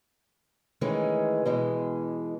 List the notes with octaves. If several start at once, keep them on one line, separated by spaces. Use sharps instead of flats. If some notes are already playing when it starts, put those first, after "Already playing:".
D#3 E3 G#3 A3 C#4
B2 E3 G#3